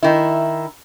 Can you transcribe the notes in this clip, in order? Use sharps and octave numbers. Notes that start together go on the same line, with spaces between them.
D#3 E4